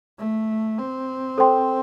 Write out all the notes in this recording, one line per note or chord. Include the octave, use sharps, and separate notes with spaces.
A3
C4
A4 C5 G5 C6